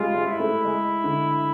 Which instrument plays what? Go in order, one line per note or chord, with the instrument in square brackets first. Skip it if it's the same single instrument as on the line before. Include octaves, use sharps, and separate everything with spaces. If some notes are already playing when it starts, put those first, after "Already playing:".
Already playing: [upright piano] G3 G#3 [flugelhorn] F4
[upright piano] G#3
[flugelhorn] E4
[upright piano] A3
G#3
D3